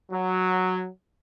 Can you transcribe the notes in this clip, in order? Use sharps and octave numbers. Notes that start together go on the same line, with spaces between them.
F#3